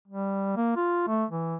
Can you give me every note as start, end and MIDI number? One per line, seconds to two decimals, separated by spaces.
0.08 0.54 55
0.57 0.76 58
0.76 1.07 65
1.08 1.25 57
1.30 1.56 52